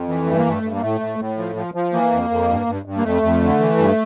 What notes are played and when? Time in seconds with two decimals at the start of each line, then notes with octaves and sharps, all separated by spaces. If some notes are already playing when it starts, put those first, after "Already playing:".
Already playing: F2
0.08 E3
0.26 G2 A3
0.38 A#3
0.46 G2 A3
0.63 G2
0.75 A#3
0.82 A2 A3
1.01 A2
1.19 A2
1.38 F3
1.56 F3
1.74 F3
1.93 E3 A#3
2.12 F2
2.30 F2
2.49 G2
2.67 G2
2.86 G2
2.97 A#3
3.04 F2 A3
3.23 F2
3.42 D3
3.60 E3
3.78 G2